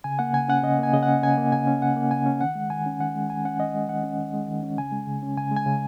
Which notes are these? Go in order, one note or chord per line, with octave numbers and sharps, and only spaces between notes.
C#3 G#5
A#3 F#5
C#3 G#5
C#4 F#5
C#3 D#5
A#3 G#5
C#3 D#5
F#5
C#4
C#3 G#5
A#3
C#3 G#5
C#4
C#3 F#5
A#3
C#3 G#5
C#4
D#3 F#5
G#3
D#3 G#5
C#4
D#3 F#5
G#3
D#3 G#5
C#4 F#5
D#3 D#5
G#3
D#3 F#5
C#4
D#3
G#3
D#3
C#4
C#3 G#5
G#3
C#3
C#4
C#3 G#5
G#3 G#5
C#3